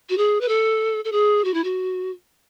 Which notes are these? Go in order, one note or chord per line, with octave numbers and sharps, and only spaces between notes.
F#4
G#4
B4
A4
A4
G#4
F#4
E4
F#4